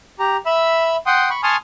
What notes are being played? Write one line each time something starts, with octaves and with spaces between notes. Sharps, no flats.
G4 A#5
E5 B5 E6
F#5 G5 C6 D#6
B5 C#6
G#5 A5 C6 C#6 D#6 F6